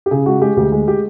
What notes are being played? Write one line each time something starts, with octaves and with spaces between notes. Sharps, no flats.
G4
C#3 G#4
G#3 F#4
G#3 G4
D2 G4
G#3
G4